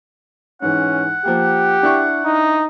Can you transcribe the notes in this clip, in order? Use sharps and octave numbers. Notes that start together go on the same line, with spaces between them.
G#2 E3 C#4 F#5
F3 A#3 G4
D4 E4 C#6
D#4